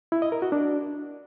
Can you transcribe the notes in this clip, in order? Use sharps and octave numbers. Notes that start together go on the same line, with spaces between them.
E4
D#5
A#4
F#4
D4